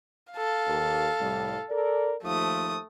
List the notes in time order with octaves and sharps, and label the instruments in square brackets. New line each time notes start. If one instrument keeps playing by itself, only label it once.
[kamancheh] A4 F5
[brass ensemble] D#2
C2 A2 G3
A4 A#4 D5
[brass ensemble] D#2 F3 [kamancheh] A3 D#6